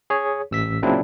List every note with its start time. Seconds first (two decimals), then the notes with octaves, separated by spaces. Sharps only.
0.10 G#4 C#5
0.51 A1 E6 B6
0.82 A#2 C#3 F#3 C4 D4 E4